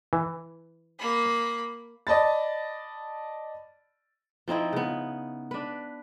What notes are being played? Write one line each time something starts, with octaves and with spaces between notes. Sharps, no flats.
E3
A#3 B5
D5 D#5 A5 B5 A6
F3 C4 D#4 E4
C#3 B3
D4 B4